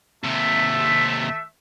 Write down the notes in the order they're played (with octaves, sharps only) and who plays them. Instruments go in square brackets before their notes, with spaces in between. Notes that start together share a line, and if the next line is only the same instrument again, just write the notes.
[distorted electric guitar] D#2 C3 [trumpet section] A3 E5